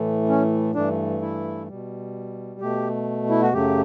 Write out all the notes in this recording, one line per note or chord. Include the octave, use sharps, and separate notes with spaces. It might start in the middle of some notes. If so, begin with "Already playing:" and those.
Already playing: A2 E3 A3
C#4
G2 E3 A3 D4
E4
B2 G3
B2 A3 G4
E4
F#4
F#2 C#3 F#3 A3 G4